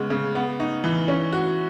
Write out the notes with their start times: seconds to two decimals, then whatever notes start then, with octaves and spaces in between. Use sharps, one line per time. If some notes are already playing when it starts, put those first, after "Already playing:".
Already playing: C#3 G#3 B3
0.10 C#3
0.35 B3
0.60 D#4
0.84 E3
1.08 C#4
1.32 F#4